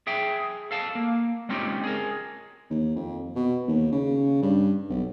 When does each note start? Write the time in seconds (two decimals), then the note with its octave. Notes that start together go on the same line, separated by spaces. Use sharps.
0.07 G#4 E5 G5
0.71 A4 F5 A5
0.95 A#3
1.49 G#3 C4 C#4 D#4 F4 G4
1.84 G#4 A#4
2.70 D#2
2.96 F2
3.36 B2
3.68 D#2
3.92 C#3
4.42 G2
4.90 B1